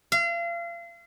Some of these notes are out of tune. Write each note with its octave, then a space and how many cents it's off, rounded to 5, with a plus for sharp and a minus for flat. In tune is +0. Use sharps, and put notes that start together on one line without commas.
F5 -35